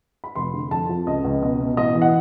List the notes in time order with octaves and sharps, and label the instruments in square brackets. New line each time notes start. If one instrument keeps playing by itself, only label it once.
[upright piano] B5
F1 C6
D3
F2 A5
F3
C#2 D#5
C#2
B2 D#5
B2
A1 D#5
E3
F#5